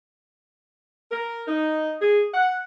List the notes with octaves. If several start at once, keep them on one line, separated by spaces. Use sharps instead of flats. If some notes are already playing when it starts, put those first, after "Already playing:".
A#4
D#4
G#4
F#5